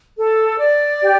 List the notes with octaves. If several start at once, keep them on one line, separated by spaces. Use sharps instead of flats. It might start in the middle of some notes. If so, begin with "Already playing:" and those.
A4
D5
G4